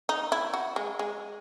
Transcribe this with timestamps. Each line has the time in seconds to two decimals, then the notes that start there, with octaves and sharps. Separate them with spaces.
0.09 D#4
0.32 E4
0.54 F#4
0.76 G#3
0.99 G#3